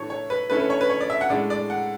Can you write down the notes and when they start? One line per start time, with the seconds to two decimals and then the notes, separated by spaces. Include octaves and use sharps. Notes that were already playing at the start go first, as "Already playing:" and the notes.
Already playing: A2 E3 A3 D4 C#5
0.10 C#5
0.30 B4
0.50 D3 A3 C#4 E4 B4
0.60 B4
0.70 C#5
0.81 B4
0.90 C#5
1.01 D5
1.10 E5
1.21 F#5
1.30 A2 G#3 D4 D5
1.50 D5
1.70 F#5